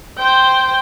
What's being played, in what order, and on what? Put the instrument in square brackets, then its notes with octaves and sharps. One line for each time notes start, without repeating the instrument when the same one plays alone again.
[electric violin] C5 G5